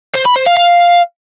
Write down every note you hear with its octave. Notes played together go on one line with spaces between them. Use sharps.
C5
B5
C5
F5
F5